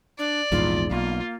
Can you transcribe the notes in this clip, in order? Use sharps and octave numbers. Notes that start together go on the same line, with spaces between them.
D4 D5
A#1 E2 G#2 F4
B1 A#3 F4